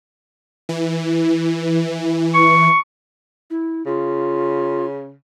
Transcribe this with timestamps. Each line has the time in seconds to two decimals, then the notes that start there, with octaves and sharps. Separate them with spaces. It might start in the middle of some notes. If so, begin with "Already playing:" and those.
0.69 E3
2.34 C#6
3.50 E4
3.86 C#3 F4